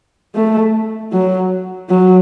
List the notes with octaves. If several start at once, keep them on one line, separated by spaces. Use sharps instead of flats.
A3
F#3
F#3